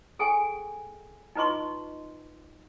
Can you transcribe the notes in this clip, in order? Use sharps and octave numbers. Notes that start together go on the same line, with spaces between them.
G#4 A4 G5 G#5
D#4 F4 B4 D#5 C6 C#6